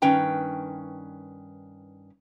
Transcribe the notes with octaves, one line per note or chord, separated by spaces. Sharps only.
G2 D#3 C#4 B4 G5 A#5